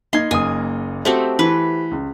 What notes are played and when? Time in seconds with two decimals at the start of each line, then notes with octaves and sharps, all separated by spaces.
0.13 A#3 D#4 C6 G#6
0.31 F#1 A#3 G#5 D#6
1.05 A3 C4 F#4 G4 C5
1.39 E3 B4
1.91 C#2